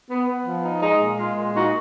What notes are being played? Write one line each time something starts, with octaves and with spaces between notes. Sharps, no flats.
B3
B3
F3
D#4
G#3 D#4
A#2
G#3 F4
A#2
A#2 D#4 F#4